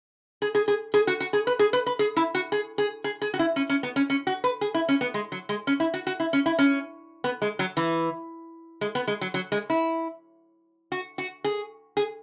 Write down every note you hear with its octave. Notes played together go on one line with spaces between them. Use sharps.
G#4
G#4
G#4
G#4
F#4
F#4
G#4
B4
G#4
B4
B4
G#4
E4
F#4
G#4
G#4
G#4
G#4
F#4
E4
C#4
C#4
B3
C#4
C#4
F#4
B4
G#4
E4
C#4
B3
G#3
F#3
G#3
C#4
E4
F#4
F#4
E4
C#4
E4
C#4
B3
G#3
F#3
E3
G#3
B3
G#3
F#3
F#3
G#3
E4
F#4
F#4
G#4
G#4